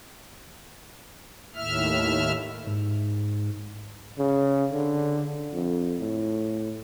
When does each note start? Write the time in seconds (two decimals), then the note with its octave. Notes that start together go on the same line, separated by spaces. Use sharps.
1.55 D#2 A2 E5 F6
2.66 G#2
4.18 C#3
4.72 D3
5.53 F2
6.00 A2